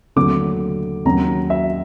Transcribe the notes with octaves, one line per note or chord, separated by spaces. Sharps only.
D#2 D3 F#3 A3 D6
D#2 C#3 F#3 A#5
E5